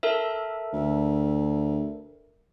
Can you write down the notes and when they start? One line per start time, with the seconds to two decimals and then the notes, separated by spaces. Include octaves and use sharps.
0.03 A4 A#4 E5
0.73 D2